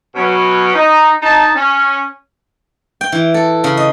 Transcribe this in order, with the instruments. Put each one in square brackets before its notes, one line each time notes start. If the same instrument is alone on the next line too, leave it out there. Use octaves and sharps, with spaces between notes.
[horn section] B2 F#3 C#4
D#4
D#4 A5
C#4
[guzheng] G5
E3
A4
C#3
D#5